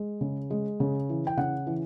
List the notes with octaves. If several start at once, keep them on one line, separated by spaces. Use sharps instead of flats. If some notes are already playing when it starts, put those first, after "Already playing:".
Already playing: G#3
C#3
G#3
C#3
E3
G5
C#3 F#5
E3